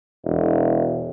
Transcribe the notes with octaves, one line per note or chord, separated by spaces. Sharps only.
E1